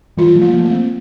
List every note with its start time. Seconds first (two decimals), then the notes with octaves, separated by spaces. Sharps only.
0.17 E3 G3 F4
0.35 F3 A3
0.42 A#3
0.53 F3 A3
0.65 A#3
0.70 A3 C4